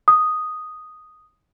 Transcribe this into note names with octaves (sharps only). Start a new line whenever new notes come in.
D#6